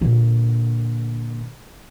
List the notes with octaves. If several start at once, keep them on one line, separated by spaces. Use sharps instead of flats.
A#2 D3